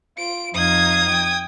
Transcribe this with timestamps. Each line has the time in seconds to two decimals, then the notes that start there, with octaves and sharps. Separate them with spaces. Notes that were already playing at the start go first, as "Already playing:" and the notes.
0.18 F4 D7
0.55 F2 D#4 F5 D#6 G#6
1.10 G5